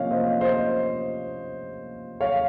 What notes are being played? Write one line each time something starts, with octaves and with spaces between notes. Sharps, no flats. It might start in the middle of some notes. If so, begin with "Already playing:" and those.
Already playing: C3 F3 A#3 C#4 C#5 D#5 F5
C5 D#5
C5 D#5
C#5 F5